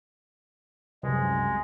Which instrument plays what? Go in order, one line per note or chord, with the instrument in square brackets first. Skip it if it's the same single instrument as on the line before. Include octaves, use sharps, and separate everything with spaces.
[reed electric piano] C2 F#2 [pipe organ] G#3